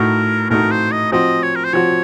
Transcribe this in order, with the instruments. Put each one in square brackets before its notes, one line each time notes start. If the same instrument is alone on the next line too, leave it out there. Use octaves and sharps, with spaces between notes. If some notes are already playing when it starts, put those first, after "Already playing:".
Already playing: [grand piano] A2 A3 D#4 F#4 [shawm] A#4
[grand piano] A2 A3 D#4 F#4 [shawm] A#4
[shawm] C5
D#5
[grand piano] F3 C4 F#4 [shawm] D#5
[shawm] C#5
A#4
C5
[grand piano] F3 C4 F#4 [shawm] C#5